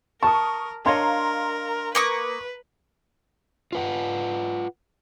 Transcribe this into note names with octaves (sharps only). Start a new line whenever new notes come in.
A#4 A5 C#6 D#6
D4 A#4 C#5 D#5 F5 A#5 C6
A#3 B4 C#6 D#6
F4 B4 F#5